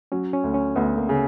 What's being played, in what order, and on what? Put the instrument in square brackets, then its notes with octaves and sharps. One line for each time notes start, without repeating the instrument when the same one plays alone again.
[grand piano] F#3 [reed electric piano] C#4
[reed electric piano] C#4
[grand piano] D2
[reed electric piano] C#4
[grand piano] D2 [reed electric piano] B3
[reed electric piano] A#3
[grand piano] C#3